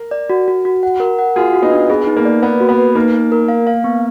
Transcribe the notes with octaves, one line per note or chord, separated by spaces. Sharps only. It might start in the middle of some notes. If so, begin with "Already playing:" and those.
Already playing: A#4
D5
F#4
F#4
F#4
F#5
A#4
F#5
F4 F#4 G#4
F#4
B3 D#4
D4
B3 G#4
D#4
A#3
D5
B3 B4
F#4
B3
B4
A#3 D#4
D#4
A#4
F5
F5
B3